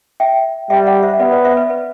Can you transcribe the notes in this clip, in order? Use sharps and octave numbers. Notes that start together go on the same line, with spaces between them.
E5 G5
G3 E5 G5
D5 F#5
C5 E5
E5
B3 B4 D5
B4 D5
C5 E5
B4 D5
B4